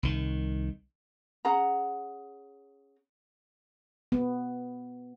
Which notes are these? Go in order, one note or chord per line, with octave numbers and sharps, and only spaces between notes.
C2 D#3
C#4 G#4 F#5 A#5
B3